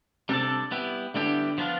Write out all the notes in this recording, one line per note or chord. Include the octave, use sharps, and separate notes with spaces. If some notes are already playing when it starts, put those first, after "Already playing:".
C3 G3 C4 D4 A4 D5
G3 B3 E4 G4
D3 G3 B3 D4 E4 G4
F3 B3 D4 F4